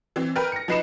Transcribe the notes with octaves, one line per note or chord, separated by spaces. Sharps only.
E3 C4
A#4 B4 G5 A#5 F6
A#6 C#7
F3 D#4 B4 C7 C#7 E7